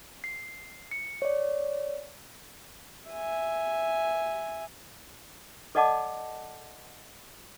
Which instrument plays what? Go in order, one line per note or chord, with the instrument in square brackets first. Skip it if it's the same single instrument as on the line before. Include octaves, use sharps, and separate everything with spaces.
[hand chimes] C7
C#7
C#5 D5
[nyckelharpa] E5 G#5
[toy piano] A4 D5 D#5 F#5 A5 D6